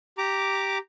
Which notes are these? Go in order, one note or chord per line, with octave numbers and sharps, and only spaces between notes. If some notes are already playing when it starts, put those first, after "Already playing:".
G4 A#5 D6